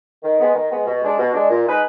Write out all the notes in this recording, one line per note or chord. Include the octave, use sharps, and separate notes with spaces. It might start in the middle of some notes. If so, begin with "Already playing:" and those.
D#3
G#3 B3
D#3
G#3 B3
B2
G#3 D4
B2
G#3 D4
A#2
G#3 D#4 G#4 B4